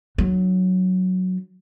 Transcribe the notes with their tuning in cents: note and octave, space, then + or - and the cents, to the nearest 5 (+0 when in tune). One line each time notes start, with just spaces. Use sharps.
F#3 +0 D4 +35